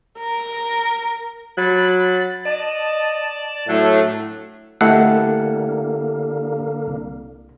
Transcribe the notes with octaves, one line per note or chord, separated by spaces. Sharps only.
A#4
F#3 B5 A6
D5 D#5 A5
A2 F#3 A3 D4 A4
D3 A3 A#3 E4 G4 A4 F#5
C2